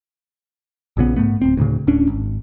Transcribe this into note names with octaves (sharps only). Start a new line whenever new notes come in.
A#1 A#2 C#3 B3
G#2 A3 B3
D1 C4
D2 A2 C#3
D1 A2 C#4 D4
G#1